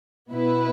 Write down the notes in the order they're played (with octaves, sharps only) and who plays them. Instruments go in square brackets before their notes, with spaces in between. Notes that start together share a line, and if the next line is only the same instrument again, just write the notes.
[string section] B2 B3 E4 B4